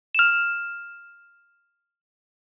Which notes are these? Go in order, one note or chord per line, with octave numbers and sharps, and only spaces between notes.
F6 E7